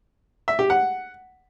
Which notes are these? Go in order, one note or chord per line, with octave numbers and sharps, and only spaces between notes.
E5
G4
F#5